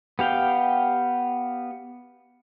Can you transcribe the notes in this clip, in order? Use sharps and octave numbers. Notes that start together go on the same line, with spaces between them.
B3 G4 F5 G5